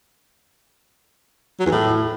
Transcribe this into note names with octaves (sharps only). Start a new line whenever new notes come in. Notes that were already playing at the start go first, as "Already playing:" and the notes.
F#3
E2
A2